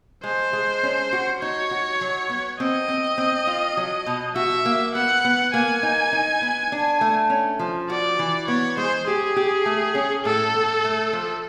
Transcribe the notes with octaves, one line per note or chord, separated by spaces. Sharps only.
G#3 C5
G#3
C#4
F#4
D#4 C#5
F#4
F#3
B3
C4 D#5
C4
C4
F4
F#3
B2
F#4 E5
A#3
B3 F#5
B3
A#3 G#5
D#4
D#4
B3
D4
A3
C#4
F3
F#4 D5
E3
B3 C#5
G#3 C5
G4 G#4
G4
A3
C#4
A2 A4
A2
A3
F3